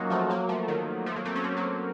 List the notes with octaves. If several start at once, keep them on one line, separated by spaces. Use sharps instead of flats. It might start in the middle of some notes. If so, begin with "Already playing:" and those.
Already playing: F#3 A#3 C#4 D#4 F4 F#4
F3 A3
F#3 A#3
F3 A3
D#3 F#3
F3 A3
F#3 A#3
A3 C4
A#3 C#4
A3 C4
F#3 A#3